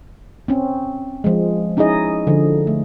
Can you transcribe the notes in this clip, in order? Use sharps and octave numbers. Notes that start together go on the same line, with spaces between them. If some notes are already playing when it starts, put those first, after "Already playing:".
C4 C#4
F3 G#3
C#4 D#4 E4 G#4 D#5
D3 F3
A3